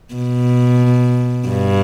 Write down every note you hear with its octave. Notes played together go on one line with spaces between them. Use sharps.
B2
G2